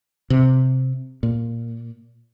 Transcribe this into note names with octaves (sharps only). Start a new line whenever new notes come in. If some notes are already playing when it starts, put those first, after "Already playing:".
C3
A#2